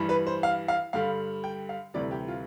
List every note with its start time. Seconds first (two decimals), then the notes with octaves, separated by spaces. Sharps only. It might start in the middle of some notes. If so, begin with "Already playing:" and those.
Already playing: G2 E3 G3
0.09 B4
0.27 C5
0.43 F5
0.68 F5
0.93 G2 D3 G3 F5
1.44 G5
1.69 F5
1.94 D2 C3 E3 G3 D5
2.11 G4
2.28 F4